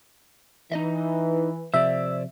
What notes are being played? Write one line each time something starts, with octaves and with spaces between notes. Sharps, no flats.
E3 D#4 D#5 E5
C3 F3 C5 D5 E5